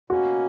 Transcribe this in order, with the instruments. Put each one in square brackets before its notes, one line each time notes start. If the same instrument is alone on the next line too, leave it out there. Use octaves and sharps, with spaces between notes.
[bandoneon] B2 A#3 C#4 [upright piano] F#4